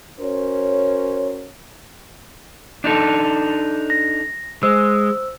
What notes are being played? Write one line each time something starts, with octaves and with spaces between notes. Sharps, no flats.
C#4 F#4 A#4 C5 C#5
D4 D#4 A4
A#6
G#3 C5 E6